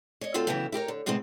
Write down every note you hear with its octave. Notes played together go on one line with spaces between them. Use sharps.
C#5 D#5
D2 C4 F4 F#4 A4
C#3 E3 F#3 B3 E4 G4
E4 G4 A#4 C#5
D3
D2 A2 C3 G#3 B3 C4